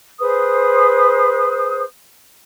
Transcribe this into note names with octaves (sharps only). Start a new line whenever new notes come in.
G#4 B4 C5 D#6